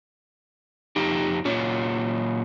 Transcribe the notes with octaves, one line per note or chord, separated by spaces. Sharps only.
F2 D#4 G4
A#2 C#4 F4 C#5